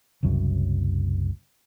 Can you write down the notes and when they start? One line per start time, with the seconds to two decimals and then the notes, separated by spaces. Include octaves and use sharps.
0.23 F#1 C2 F#2 F#3